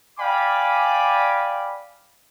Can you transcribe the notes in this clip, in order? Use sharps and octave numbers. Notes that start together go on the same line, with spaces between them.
D5 F5 G5 G#5 B5 D6